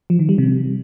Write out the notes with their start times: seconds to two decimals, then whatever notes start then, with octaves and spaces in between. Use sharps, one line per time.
0.10 F3
0.19 D#3
0.29 G3
0.38 C3